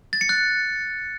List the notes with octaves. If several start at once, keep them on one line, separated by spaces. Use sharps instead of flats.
A6
C#7
F#6